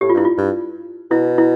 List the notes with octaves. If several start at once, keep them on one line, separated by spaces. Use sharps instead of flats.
A2 G4
F4
G2 E4
F4
G2
B2 E4
E4